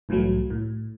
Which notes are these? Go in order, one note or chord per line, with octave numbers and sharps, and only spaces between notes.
C2 A2 E3 F#3 A3
A2